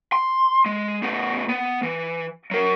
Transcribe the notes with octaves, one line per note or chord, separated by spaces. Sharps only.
C6
G#3
A2 B3
B3
E3
F#3 A#4